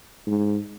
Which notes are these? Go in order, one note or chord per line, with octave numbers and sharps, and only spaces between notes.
G#2